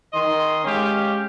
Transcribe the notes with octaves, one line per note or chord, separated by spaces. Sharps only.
D#3 D#5 C6
G#3 C#4 G4 F5